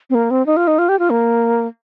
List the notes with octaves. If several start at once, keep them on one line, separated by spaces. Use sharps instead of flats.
C4
A#3
C4
D#4
F4
D#4
F4
G4
F4
A#3